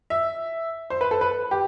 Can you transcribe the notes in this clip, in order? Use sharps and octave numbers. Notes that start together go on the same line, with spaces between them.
E5
C5
B4
A4
B4
G4